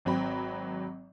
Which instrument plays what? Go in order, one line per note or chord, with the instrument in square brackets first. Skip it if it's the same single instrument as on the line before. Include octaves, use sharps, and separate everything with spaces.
[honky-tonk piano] G#1 F#3 C4 B5